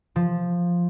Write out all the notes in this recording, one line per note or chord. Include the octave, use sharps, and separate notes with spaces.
F3